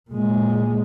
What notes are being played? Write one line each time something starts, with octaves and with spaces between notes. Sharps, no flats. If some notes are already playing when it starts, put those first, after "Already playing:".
A#2 G#3